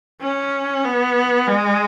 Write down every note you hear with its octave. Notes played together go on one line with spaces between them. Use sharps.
C#4
B3
G#3